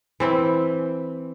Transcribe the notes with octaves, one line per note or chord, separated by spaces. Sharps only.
E3 C4 E4